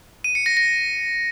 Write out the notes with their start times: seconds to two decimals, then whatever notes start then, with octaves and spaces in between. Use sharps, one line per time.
0.24 D#7
0.35 C#7
0.46 A#6
0.57 A#6